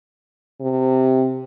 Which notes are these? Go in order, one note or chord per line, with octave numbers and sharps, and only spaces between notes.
C3